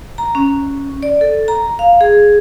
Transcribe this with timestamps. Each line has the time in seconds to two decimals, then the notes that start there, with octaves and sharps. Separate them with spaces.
0.18 A#5
0.35 C#4
1.03 D5
1.21 A4
1.48 A#5
1.79 F5
2.01 G#4